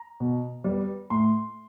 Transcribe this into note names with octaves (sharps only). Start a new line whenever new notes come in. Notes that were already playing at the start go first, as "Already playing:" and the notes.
Already playing: A#5
B2
G3 B3
A2 C6